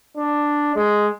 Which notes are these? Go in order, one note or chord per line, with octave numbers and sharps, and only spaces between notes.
D4
G#3